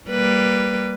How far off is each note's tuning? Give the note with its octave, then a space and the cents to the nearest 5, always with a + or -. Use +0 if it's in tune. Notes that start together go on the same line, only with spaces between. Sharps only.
G3 +0 A#3 +0 B4 +0